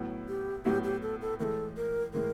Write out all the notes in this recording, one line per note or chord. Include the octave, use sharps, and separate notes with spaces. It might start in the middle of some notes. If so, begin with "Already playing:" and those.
Already playing: A2 F#3 B3 E4
G4
A2 F#3 B3 E4 G4
G4
A4
A4
A2 E3 G#3 A4 A#4
A#4
A2 E3 G#3 A#4